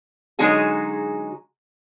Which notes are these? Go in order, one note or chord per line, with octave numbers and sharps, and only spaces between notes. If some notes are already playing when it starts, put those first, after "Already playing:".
D3 F#3 G#3 D#4 F#4 G#4